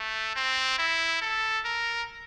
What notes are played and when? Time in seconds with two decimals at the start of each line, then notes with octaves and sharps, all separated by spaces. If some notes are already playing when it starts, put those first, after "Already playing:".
Already playing: A3
0.36 C4
0.79 E4
1.21 A4
1.65 A#4